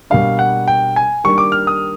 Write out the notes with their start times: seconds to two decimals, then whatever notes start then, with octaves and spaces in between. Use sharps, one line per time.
0.10 B2 G3 A#3 D4 F5
0.39 F#5
0.68 G5
0.96 G#5
1.24 D#3 G3 A#3 D4 C#6
1.38 D6
1.52 F6
1.67 D#6